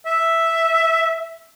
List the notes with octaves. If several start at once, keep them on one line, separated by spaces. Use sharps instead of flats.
E5